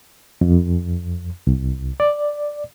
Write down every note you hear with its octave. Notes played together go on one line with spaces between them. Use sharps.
F2
C2
D5